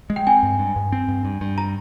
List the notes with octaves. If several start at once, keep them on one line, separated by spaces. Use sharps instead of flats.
G#3
G5
C4 G#5
G2
G2
G2
C4
G2
G2
G2
A#5